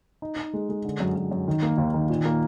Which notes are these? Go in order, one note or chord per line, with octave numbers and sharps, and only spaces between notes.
D#4
D#4
G#3
G#3
D3
F#2
F#2
F#2
D#3
A#3
D#2
D#3
A#2
A#3